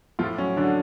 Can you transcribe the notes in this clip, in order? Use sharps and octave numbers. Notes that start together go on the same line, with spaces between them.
A2 F3 F4
F#3 C#4
D3 F#3 D4